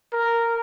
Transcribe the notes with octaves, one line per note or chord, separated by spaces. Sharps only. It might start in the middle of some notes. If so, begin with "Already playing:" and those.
A#4